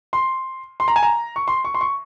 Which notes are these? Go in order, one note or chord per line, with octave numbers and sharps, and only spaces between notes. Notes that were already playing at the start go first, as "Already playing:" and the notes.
C6
C6
A#5
G#5
A#5
C#6
C6
C#6
C6
C#6